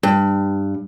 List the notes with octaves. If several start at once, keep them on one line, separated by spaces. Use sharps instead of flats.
G2